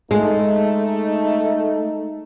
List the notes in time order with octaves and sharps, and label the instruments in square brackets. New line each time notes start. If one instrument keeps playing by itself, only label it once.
[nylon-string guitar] G#3 [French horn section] A3 D#4